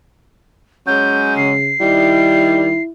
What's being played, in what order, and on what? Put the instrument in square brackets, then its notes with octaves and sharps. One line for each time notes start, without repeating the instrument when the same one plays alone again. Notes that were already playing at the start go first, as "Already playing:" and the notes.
[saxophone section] F#3 G#3 C#4 [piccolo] G6
[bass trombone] C#3 [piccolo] C7
[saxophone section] D#3 G3 [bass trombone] E4